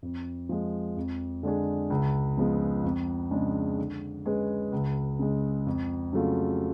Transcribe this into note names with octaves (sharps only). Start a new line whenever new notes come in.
F2
F3 G#3
F2
D3 G#3 D4 G#4
C#2
C#3 F3 G#3 B3
F2
C#3 G#3 D4
D3
G#3 C#4 G#4 B4
C#2
C#3 G#3
F2
C#3 F#3 A3 F4